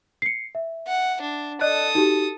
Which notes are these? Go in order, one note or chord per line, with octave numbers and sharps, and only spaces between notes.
C7 C#7
E5
F#5
D4
A4 D5 D#5 D#6 F#6
D#4 F#4 G4